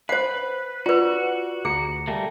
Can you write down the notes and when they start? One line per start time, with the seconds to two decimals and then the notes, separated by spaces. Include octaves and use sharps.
0.09 B4 C5 F#5
0.86 F4 F#4 B4 D5
1.65 D2 G#4 A#5 C#7
2.07 G3 A3 A#3